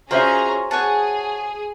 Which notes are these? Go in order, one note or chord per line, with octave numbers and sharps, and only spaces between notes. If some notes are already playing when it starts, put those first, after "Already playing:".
C#4 F4 F#4 G#4 C5 E5 A#5
G#4 C#5 F#5 A5